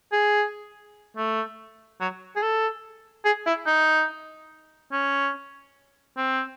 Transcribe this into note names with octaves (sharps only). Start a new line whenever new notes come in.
G#4
A3
F#3
G#4
A4
G#4
E4
D#4
C#4
C4